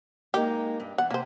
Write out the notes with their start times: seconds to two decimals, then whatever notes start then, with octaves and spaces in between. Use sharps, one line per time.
0.34 G#3 A#3 D#4 G4
0.80 G2
0.98 E2 F#5
1.10 C3 A#3 C5